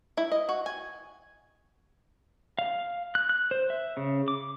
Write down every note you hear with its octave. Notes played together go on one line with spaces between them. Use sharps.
E4
D#5
F#4
G#5
F5
F#6
F#6
C5
E5
C#3
D6